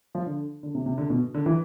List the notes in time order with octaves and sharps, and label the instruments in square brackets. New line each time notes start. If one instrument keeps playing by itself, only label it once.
[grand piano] F3
D3
D3
C3
C3
D3
B2
D3
E3